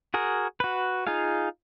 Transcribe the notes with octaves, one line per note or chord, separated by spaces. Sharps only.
F#4 G#4 A#4
F#4 B4
D#4 F4 G#4 F5